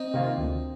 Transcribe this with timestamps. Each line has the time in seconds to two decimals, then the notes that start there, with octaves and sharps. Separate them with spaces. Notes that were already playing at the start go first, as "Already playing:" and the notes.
Already playing: C4 D#4
0.14 C3 D#3 A#3 F4
0.38 D2